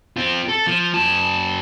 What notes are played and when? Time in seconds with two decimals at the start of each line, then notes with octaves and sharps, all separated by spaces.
0.17 C4 F4
0.48 A4
0.67 F3
0.94 F#2 A5